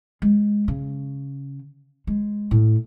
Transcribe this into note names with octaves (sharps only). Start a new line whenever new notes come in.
G#3
C#3
G#3
A2